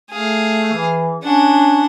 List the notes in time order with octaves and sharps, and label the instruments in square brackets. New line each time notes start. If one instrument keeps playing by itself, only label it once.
[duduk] A3 [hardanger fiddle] G#4 F5
[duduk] E3
[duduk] C#4 [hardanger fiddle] D4 F#5